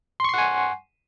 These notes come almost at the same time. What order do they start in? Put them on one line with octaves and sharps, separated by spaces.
C6 C#6 C7 F#5 G#5